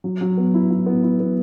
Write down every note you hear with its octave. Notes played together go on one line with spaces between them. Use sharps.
F#3
F#3
B3
E4
E4
B3
E4
B3